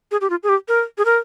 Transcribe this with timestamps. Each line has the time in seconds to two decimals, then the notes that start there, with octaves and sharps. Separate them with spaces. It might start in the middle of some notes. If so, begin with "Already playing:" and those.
0.11 G#4
0.21 G4
0.30 F4
0.43 G#4
0.49 G4
0.68 A#4
0.98 G#4
1.05 A#4